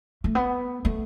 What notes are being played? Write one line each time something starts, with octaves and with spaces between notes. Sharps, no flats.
A3
B3
A3